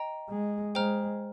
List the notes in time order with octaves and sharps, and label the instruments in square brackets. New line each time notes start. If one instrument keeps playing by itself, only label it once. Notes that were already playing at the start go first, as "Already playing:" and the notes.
Already playing: [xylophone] D#5 G5 A#5
[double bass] G#3
[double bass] G#3 [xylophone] C5 G5 A#5 F6